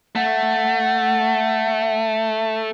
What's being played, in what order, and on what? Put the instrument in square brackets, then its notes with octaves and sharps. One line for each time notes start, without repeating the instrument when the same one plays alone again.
[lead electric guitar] A3 [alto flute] F#5